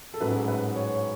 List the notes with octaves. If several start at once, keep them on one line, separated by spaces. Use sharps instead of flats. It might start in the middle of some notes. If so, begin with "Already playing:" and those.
A4
A1 G#2 F#3 B4
B4
C#5